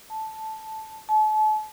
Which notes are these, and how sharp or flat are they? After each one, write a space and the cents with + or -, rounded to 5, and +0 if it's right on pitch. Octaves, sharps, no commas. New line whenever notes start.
A5 -5
A5 -40